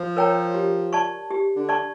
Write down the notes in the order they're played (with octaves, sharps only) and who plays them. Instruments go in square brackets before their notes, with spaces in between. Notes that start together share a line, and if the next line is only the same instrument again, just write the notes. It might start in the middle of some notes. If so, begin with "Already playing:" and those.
Already playing: [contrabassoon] F3
[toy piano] A#4 C#5 G5 A#5
G4
D5 A5 C#6
G4
[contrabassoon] D3
[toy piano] D5 A5 C#6